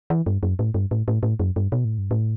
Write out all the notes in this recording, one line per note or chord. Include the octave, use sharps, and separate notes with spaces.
E3
G2
F#2
A2
G2
A2
A2
A2
F#2
G2
B2
A2
G2
A2